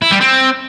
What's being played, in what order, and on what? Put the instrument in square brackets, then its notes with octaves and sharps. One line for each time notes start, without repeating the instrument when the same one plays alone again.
[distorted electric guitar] E4
G3
C4